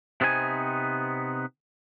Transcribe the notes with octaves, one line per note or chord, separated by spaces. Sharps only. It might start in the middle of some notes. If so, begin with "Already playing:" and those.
C3 B3 C4 D#4 E5 G#5